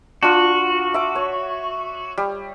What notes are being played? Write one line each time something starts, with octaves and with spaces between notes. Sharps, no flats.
D4 F4 F#4
E5 D6
C#5
G3